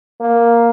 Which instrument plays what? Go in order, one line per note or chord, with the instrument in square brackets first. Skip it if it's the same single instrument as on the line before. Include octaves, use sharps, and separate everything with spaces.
[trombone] A#3